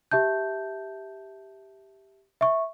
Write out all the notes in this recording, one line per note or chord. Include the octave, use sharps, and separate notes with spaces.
G4 E5 A5 G6
E5 C#6